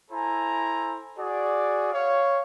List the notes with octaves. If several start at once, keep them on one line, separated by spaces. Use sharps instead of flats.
E4 A4 C5 G#5 A#5
F#4 G#4 D5
C#5 F5